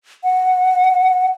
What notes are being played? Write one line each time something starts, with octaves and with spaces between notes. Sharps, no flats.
F#5